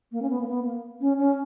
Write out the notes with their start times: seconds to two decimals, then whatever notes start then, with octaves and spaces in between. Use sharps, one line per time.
0.12 A#3
0.22 C#4
0.30 B3
0.41 A#3
0.48 B3
0.65 A#3
1.01 C#4
1.18 C#4